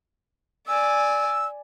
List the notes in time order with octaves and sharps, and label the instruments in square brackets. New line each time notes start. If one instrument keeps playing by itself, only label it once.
[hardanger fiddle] D5 G#5 [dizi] E6